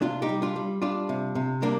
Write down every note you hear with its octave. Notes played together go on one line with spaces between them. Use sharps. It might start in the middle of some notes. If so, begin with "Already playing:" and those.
C3 D4 F4
D#4 G4
G3
D4 F4
G3
G3 D4 F4
C3
C3
G3 A#3 D4